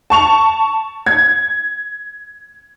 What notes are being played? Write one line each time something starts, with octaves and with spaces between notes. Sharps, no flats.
A5 C#6 F7
G#6